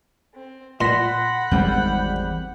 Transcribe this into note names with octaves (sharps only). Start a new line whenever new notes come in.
C4
A#2 F#5 B5 C6 F#6 A#6 B6
G#1 E2 G3 G#3 C4 G6